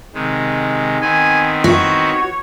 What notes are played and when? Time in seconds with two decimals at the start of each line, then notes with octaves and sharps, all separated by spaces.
0.14 C3 D#3 G#3
1.02 D#3 B3 C4 G#5
1.64 F#4 C#5